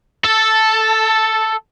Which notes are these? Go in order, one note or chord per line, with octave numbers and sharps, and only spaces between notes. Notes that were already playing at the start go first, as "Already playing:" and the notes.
A4